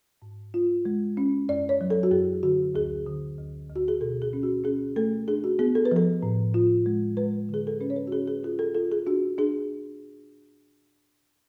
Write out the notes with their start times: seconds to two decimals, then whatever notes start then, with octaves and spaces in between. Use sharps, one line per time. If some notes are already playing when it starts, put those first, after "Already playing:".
0.22 G#2
0.54 F4
0.85 G#3
1.17 C#4
1.49 F#2 D5
1.69 C#5
1.81 F#3
1.90 A4
2.03 F#4
2.11 F#2 G#4
2.43 D3 F#4
2.75 D2 G#4
3.06 D3
3.38 D2
3.70 D2
3.76 F#4
3.88 G#4
4.01 B2 A4
4.22 G#4
4.33 C#4
4.43 F#4
4.64 C#4 G#4
4.96 A3 A4
5.28 D4 G#4
5.44 F#4
5.59 B3 G#4
5.75 A4
5.85 B4
5.91 F3 A4
6.23 A2
6.54 F4
6.86 G#3
7.17 G#3 B4
7.49 D3 G#4
7.67 A4
7.81 C#4 B4
7.90 C#5
7.96 B4
8.07 F#4
8.12 C#4 G#4
8.27 G#4
8.44 F4 G#4
8.59 A4
8.75 F4 A4
8.92 G#4
9.07 D4 F#4
9.38 D4 G#4